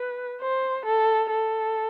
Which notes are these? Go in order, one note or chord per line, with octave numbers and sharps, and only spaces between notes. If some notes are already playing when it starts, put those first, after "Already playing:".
Already playing: B4
C5
A4
A4